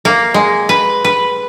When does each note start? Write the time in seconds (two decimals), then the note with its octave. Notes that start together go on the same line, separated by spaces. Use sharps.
0.05 A#3
0.34 G#3
0.69 B4
1.04 B4